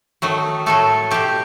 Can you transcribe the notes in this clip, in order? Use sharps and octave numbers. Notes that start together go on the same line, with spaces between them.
D#3 F#3 A3
A2 F#3 A3 A4
B2 A3 G4